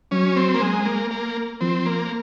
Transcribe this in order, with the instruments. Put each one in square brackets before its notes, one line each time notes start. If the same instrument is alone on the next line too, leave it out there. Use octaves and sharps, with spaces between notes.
[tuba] F#3 [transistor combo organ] C#4
[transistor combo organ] C4
A#3
G#3
A#3
A#3
[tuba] F3 [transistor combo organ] C4
[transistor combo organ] A#3